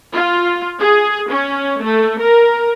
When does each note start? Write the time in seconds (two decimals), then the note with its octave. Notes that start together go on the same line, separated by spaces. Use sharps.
0.14 F4
0.80 G#4
1.29 C#4
1.82 A3
2.20 A#4